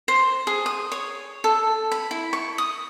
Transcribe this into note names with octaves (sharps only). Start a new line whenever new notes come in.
C5
G#4
D#6
C#5
A4
B5
E4
C#6
D#6